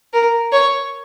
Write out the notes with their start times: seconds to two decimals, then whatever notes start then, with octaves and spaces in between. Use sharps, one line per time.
0.13 A#4
0.52 C#5